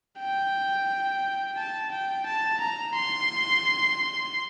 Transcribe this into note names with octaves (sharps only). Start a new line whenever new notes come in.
G5
A5
G5
A5
A#5
C6